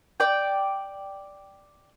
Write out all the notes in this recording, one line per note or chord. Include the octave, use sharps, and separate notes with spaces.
D5 G5